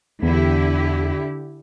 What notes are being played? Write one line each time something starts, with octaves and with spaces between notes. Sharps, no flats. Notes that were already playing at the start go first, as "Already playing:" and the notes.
E2 D3 E4 G4